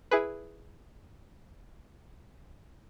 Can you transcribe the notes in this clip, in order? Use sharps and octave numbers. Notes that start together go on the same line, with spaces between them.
E4 G#4 B4